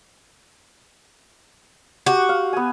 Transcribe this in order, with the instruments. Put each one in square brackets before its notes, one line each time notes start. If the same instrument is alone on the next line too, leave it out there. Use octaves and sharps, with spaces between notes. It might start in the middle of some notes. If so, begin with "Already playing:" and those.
[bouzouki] F#4 [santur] G4
[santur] F5
B3 G#5